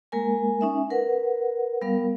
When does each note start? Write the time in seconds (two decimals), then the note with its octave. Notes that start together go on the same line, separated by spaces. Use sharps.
0.12 G#3 A#3 A#4 G#5
0.60 C#4 D#4 E5 G#5
0.90 A#4 B4 F#5
1.81 G3 B3 A#4 F5